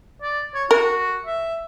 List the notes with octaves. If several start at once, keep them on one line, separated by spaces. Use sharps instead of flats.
D5
C#5
F#4 A#4
E5